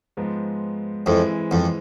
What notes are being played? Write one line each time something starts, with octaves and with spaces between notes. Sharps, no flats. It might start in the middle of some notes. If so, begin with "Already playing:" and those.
G#2 F3 G#3 B3
F2 E3 G#3 C4 E4
F2